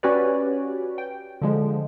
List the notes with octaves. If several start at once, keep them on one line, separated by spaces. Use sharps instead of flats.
C#4 F#4 G4 B4 C#5 D5
G5
D3 F3 G#3